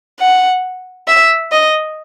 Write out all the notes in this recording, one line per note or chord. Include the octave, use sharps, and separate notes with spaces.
F#5
E5
D#5